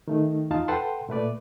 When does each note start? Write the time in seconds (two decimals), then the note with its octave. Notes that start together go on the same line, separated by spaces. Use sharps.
0.08 D#3 A3 D#4
0.50 E2 D#4 F4 F5 A5
0.68 A4 B4 F#5 G5 A5 C6
1.09 A#2 A3 B4 D5